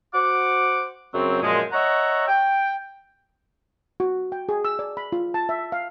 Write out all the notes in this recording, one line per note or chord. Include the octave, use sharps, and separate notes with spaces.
F#4 C5 F#5 D6
F#2 C#3 F#3 C4
F#2 A#2 F3 G#3
C#5 D#5 E5 F#5 A#5 C#6
G5
F#4
G5
G#4
E6
D5
B5
F4
A5
E5
F5